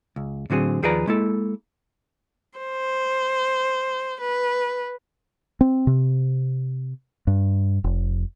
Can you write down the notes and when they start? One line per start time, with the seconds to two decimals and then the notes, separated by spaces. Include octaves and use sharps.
0.16 C#2
0.50 A2 D3 F#3 C4 G#4
0.83 D#2 F3 G#4 B4 D5 A#5
1.07 G#3 A#3 E4 A4
2.59 C5
4.21 B4
5.61 C4
5.87 C3
7.27 G2
7.84 F1